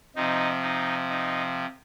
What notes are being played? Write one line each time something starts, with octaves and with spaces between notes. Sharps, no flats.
C3 F3 D#4
D#4
D#4